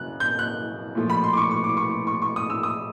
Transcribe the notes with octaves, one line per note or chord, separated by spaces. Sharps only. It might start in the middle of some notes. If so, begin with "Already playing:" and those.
Already playing: F#2 C#3 F#6
G6
F#6
A#2 F3 A3
B5
C6
D6
C#6
C#6
D6
C#6
C#6
C#6
D#6
E6
D#6